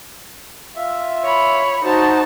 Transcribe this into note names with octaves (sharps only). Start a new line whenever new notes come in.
F4 E5
C#5 B5
D#4 F#4 C5 A5